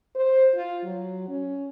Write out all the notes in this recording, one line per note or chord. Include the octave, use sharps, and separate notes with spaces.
C5
F4
F#3
C#4